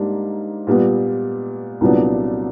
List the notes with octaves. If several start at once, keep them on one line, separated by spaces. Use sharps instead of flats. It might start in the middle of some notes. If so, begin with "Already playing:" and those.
Already playing: G#2 G3 A#3 D4
A#2 G3 B3
C2 A#2 F#3 B3 D4